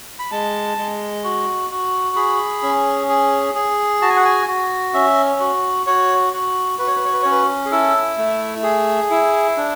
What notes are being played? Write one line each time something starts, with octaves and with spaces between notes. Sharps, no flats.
B5
G#3 A5
G#3
F#4
F#4
G#4 B5
C#4
G#4
G#4
F#4 A5
G#5
F#5
G#5
F#4
C#4 E5
F#4
F#4 C#5
F#4
F#4 B4
C#5
B4
C#5
B4
C#4 C#5
B4
G#4
E4 A4
A3
G#4
E4
D4